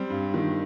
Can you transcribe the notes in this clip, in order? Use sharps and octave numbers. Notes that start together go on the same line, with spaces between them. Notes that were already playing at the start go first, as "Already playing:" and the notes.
Already playing: G3 C4
G2
D#3